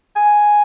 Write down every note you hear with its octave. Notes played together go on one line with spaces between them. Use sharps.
G#5